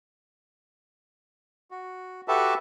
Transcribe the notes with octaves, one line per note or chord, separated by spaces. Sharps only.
F#4
F#4 G4 A4 B4 E5 A5